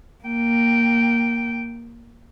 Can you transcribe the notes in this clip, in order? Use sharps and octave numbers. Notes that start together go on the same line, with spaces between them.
A#3 G5